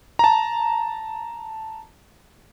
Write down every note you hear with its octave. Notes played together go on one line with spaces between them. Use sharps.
A5 A#5